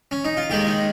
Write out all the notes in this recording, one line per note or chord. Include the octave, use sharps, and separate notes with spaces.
C#4
D#4
F4
D#2 D#3 G#3 G4
D#4